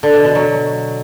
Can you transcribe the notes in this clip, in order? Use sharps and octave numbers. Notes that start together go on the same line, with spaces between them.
D3
B2
B2
F#3